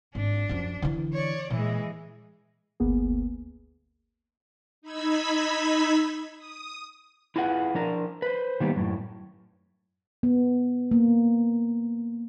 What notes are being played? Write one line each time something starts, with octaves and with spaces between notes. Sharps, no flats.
G#1 D4
F#2 F3
D3 E3
C#5 D5
A#2 E3 G#3
G1 D2 A#3 B3 G#4
D#4 B5 E6 G#6 B6
D#6
E4 F4 G#4 B4 F#5
F3 D4 A#4
B4 C5
D#3 G3 A#3 B3
F#2 A2
B3
A#3